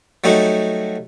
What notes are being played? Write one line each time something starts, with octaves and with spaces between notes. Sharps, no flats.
F#3 G3 A3 D#4 F#4